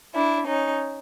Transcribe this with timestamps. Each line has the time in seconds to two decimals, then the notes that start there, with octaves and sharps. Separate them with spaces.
0.15 D4 E4
0.47 C#4 D#4